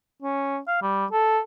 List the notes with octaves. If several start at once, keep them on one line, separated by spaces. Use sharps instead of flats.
C#4
F5
G3
A4